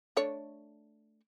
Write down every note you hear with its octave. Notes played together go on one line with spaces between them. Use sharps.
A3 D4 C#5